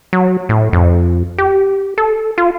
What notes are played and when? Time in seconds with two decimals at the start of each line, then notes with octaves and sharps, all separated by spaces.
0.13 F#3
0.49 A2
0.73 F2
1.38 G4
1.98 A4
2.38 F4